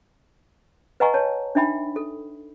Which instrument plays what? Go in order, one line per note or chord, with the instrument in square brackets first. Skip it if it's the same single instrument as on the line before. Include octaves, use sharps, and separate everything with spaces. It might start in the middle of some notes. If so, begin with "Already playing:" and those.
[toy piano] B4 D#5 F#5 G#5 A#5 C#6
B4 C#5 A5
D4 D#4 E5 G5 B5
A4